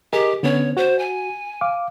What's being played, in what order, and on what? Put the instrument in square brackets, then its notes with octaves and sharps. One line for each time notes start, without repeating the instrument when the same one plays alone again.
[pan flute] G4 [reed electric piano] G#4 A#4 D#5
[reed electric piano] D3 B3 C#4 [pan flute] C#5
[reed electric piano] F#4 [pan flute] C5
[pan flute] G#5
[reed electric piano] F5 D6